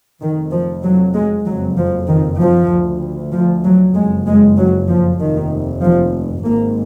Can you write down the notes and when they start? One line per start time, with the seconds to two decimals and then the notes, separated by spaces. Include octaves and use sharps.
0.21 F1 F2 D#3
0.52 F3
0.83 F#3
1.14 G#3
1.46 F#1 F2 F#3
1.78 F3
2.08 D#3
2.40 F3
2.71 D2
3.32 F3
3.64 F#3
3.95 F#1 F2 G#3
4.27 G#3
4.57 F#3
4.89 F3
5.20 F1 D#2 D#3
5.82 F3
6.44 G#1 G#2 A#3